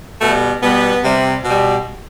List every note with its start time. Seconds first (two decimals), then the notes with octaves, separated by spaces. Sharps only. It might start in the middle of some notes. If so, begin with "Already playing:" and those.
0.21 B2 G3 A3
0.62 B2 G3 B3
1.04 C3 G3
1.45 B2 G3